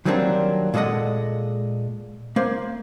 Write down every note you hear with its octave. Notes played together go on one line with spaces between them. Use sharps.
D#3 F#3 G3 A#3 C4 D4
A#2 G#3 F#4 A4 D#5 F#5
A#3 C5